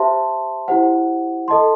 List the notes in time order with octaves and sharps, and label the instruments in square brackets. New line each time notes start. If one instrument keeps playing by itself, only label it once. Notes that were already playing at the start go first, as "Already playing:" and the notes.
Already playing: [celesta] G4 C5 E5 A5 C6
E4 G4 C5 F#5
A4 D#5 A5 C6